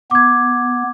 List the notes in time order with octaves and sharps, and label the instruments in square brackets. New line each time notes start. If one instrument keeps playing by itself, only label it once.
[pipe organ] B3 [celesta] D6 G#6